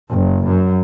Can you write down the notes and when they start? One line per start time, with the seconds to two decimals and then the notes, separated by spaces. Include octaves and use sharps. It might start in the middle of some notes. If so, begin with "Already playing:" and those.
0.10 F#1
0.45 F#2